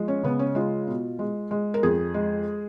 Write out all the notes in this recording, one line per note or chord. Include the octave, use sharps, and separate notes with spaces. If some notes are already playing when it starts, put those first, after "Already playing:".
Already playing: F3 G#3
C#4
C#3 B3
C#4
G#3 F4
B2
G#3
G#3
A#4
F2 G#4
G#3